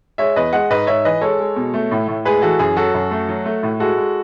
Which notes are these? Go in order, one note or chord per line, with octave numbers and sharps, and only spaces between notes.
G#3 C#5 E5
E2 B4 D#5
G#3 D#5 F#5
G#2 B4 D#5
G#2 C#5 E5
E3 B4 D#5
G#3 A4 C#5
G#3
B2
A3
A2
A2
G#3 G#4 B4
E3 F#4 A4
F#2 G#4
F#3 F#4 A4
F#2
A3
F#3
A3
A2
G#3 F#4 A4
G#3